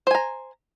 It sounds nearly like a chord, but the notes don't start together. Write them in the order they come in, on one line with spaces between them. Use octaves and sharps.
C5 G#5 A#5